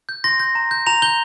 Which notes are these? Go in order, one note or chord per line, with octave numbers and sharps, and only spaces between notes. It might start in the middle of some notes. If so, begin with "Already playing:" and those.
G6
C6 A#6
G6 A#6
A#5
G6
A#5 F7
G6 G7